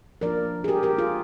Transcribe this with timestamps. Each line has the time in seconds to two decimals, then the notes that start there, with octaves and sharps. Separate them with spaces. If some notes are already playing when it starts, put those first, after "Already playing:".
0.21 F3 A#3 D4 F4 A#4 D5
0.64 G#4
0.68 G4 A#4
0.83 G4 A#4
0.98 F4 G#4